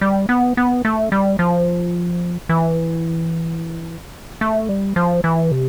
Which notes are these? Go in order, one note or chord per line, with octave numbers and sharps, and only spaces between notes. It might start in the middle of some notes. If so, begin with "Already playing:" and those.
G3
B3
B3
A3
G3
F3
E3
A3
G3
F3
E3
C3